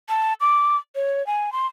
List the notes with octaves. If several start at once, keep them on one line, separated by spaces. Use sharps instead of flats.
A5
D6
C#5
G#5
C6